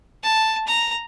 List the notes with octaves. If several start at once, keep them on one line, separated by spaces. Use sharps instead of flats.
A5
A#5